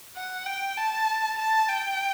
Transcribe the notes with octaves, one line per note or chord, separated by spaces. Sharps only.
F#5
G5
A5
A5
G5